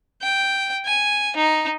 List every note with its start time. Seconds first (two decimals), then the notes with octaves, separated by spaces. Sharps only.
0.22 G5
0.85 G#5
1.36 D#4